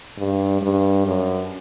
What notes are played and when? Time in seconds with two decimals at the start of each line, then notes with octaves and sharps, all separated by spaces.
0.18 G2
0.62 G2
1.06 F#2